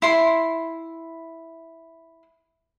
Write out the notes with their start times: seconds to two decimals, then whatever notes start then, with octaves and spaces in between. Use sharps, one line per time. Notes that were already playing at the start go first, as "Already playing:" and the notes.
0.02 E4 C6